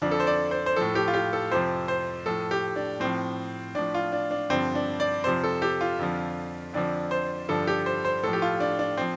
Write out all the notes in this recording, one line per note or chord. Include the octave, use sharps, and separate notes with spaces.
F2 D3 F3 D4
A4
C5
D5
C5
C5
A2 F3 A4
G4
F4
G4
A4
F2 C3 F3 C5
C5
A2 F3 A4
G4
D4
A2 F3 C4
A2 F3 D4
F4
D4
D4
G2 D3 F3 C4
D4
D5
F2 C3 F3 C5
A4
G4
F4
F2 D3 F3
F2 D3 F3 D4
C5
G2 D3 F3 A4
G4
C5
C5
A2 F3 A4
G4
F4
D4
D4
F3 C4